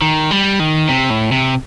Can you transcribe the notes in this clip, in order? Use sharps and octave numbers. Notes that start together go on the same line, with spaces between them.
D#3
G3
D#3
C3
A2
C3